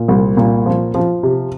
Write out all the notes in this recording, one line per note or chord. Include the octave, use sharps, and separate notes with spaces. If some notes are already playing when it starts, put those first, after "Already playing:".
Already playing: A#2
C2
A#2
F3
F3
C3